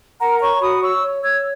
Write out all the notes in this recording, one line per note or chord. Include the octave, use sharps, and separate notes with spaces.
A#4 F#5 A#5
C#5 A#5 C#6
F#4 B5 D#6
C#5 C#6 E6
C#5
C#5 E6 G#6